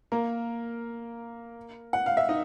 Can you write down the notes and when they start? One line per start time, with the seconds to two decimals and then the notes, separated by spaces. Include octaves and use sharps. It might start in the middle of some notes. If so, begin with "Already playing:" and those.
0.12 A#3 A#4
1.93 F#5
2.06 F5
2.17 E5
2.29 D#4 D#5